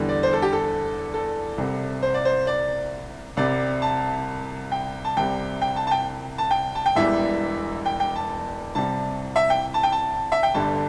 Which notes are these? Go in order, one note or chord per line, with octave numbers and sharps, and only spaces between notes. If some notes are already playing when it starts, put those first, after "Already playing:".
Already playing: E2 D3 G3
D5
C5
A4
G4
A4
A4
C2 C3 G3
C5
D5
C5
D5
C2 C3 G3 D5
A5
G5
A5
C2 C3 G3 G5
G5
A5
A5
G5
A5
G5
A5
G5
E1 E2 E3 G3 E5
G5
G5
A5
C2 C3 G3 A5
E5
G5
A5
G5
A5
E5
G5
G1 G2 D3 G3 A5